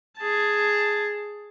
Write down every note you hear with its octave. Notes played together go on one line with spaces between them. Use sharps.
G#4 A5